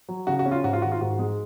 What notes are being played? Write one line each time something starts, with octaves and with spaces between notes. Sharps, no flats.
F#3
C#3 F#4
F#4
C#4
F4
G#2 F#4
F4
D#3 F#4
F4
G#2 F#4
G#3